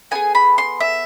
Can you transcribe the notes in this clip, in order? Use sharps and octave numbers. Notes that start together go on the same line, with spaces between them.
B3 E4 G#4 G#5
B5
C6
E5